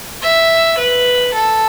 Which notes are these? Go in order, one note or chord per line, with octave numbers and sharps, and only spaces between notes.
E5
B4
A4